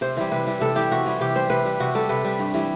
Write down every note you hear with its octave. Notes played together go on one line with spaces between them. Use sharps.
C3 C5
E3 G3
C3 B4
E3 G3
C3 A4
E3 G3 G4
C3 F#4
E3 G3
C3 G4
G3 C5
C3 B4
G3
C3 F#4
G3 A4
C3 B4
G3
G2
E3 G3